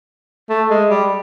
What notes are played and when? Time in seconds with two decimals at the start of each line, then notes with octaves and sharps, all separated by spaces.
0.50 A3
0.70 G#3
0.90 G3